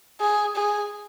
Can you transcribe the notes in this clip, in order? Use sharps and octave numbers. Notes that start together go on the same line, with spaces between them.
G#4
G#4